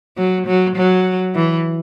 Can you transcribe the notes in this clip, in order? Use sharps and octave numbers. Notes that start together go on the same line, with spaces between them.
F#3
F#3
F#3
E3